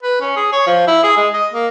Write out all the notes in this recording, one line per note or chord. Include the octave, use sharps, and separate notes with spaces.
B4
C#4
G#4
C#5
F3
E4
G#4
G#3
D#5
A#3